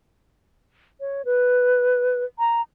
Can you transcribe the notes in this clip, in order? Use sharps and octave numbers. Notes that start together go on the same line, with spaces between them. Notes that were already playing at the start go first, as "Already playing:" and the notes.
C#5
B4
A#5